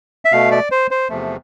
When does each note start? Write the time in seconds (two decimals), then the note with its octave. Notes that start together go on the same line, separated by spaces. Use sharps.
0.25 E5
0.32 B2 A3 F5
0.51 D5
0.71 C5
0.91 C5
1.09 E2 C3 F3 A3